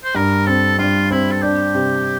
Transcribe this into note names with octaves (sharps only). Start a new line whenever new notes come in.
C5
G2 A#4
C4 A4
G2 F4
C4 E4
A4
D4 G4
C3